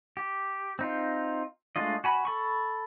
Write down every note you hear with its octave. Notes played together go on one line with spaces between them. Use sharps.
G4
C4 D#4 F4
G#3 A3 D4 F4 D#5
F#4 G#5 B5
A4 B5 C#6